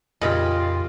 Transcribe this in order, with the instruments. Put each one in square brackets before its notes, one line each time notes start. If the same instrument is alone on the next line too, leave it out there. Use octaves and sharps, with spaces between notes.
[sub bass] F2 [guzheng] A#2 C#3 B5 [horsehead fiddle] F4 G4 [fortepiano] D#5